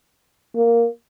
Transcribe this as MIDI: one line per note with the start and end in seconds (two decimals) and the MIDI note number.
0.56 0.87 58